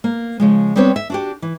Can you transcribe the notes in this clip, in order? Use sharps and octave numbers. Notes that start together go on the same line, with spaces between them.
A#3
C#3 F3 G#3
G3 B3 C4 D4 C#5
E5
D4 F#4 G4
E3